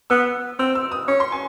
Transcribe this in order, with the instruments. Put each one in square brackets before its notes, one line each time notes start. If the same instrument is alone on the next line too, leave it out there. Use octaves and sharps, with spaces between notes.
[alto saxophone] B3 [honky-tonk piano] E6
[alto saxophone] C4 [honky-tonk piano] E6
[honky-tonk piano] E6
D#6
[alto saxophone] C#4 [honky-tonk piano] C#6
[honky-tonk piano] C6
G#5